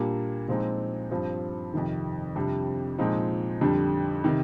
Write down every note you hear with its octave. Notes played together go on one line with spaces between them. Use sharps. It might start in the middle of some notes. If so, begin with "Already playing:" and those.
Already playing: A#2 G3 A#3 D4
A#2 F3 G#3 C4 D#4
G2 F3 C4
F2 C3 D#3
F2 C3 G3 D4
A#2 F3 G#3 C4 D#4
F2 D3 G3 D4
C3 D#3